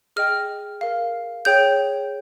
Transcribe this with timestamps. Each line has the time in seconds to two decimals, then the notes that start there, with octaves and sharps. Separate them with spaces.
0.16 G#4 D#5 G5 F6
0.81 A#4 F5
1.45 G#4 C#5 G5 G6